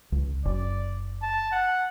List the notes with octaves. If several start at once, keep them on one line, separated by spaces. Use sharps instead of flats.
C#2
F#1 D5
A5
F#5